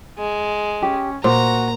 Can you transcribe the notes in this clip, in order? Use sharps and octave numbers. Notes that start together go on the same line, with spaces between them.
G#3
C#4 G4
A#2 F#4 C5 A#5